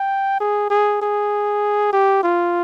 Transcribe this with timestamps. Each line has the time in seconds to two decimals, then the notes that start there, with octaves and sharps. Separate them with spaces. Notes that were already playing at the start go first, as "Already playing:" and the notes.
Already playing: G5
0.40 G#4
0.70 G#4
1.01 G#4
1.93 G4
2.23 F4